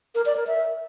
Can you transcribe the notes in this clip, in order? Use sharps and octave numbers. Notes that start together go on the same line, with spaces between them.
A#4
D5
A#4
E5